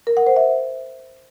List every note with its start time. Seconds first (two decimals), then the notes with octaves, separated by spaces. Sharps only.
0.07 A#4
0.17 F#5
0.27 C5
0.36 E5